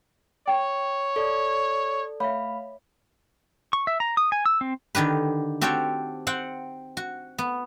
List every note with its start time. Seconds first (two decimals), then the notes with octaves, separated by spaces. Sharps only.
0.47 C#5 G5
1.16 A4 D5
2.20 A3 C#5 E5 F5 B5
3.73 C#6
3.87 E5
4.00 A#5
4.17 D#6
4.32 G#5
4.46 E6
4.61 C4
4.95 D3 D#3 G4 B4
5.61 C4 F#4 G4 A4 C#5 G5
6.27 C4 F#5 G5
6.97 F#4
7.38 B3